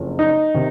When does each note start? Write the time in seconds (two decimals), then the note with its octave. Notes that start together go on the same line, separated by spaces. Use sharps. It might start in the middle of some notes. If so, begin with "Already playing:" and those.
Already playing: F#1 F2 C#3
0.19 D#4
0.55 C3 D#3